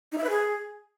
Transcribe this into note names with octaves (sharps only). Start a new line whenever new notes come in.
D#4
E5
B4
G#4